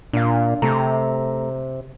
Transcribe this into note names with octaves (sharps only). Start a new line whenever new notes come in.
A#2 D4 F5
C3 A3 A4 A#5